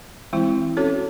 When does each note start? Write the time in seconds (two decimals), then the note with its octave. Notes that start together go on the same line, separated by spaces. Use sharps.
0.33 E3 G#3 C4 E4
0.77 C#4 F#4 A4 C#5